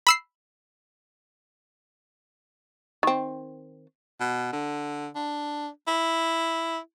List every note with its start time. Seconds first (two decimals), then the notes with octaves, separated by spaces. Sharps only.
0.07 B5 E6 C7
3.03 D#3 C4
4.20 B2
4.53 D3
5.15 D4
5.88 E4